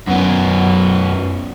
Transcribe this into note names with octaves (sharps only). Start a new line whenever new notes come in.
F#2 B3